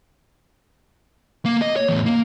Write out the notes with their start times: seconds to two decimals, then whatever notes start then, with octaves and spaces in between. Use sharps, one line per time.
1.45 A#3
1.62 D#5
1.76 C#5
1.89 E2 A2
2.06 A#3